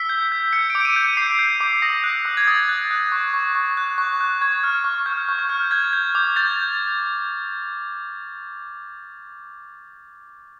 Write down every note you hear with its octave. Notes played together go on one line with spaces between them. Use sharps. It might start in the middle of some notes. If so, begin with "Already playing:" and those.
Already playing: E6 B6
G6
G6
G6 C#7
D7
D6
D7
D#7
G6 C#7
D6 C7
G6
D6
D#6 A#6
F#6
D#6
G#6
D#6 A6
F#6
F#6
C#6
C#6
C#6
F#6
C#6
F#6
C#6 G#6
F6
C#6
F6 G6
C#6
G6
F6
G6 G#6
G6
D6
G6 A6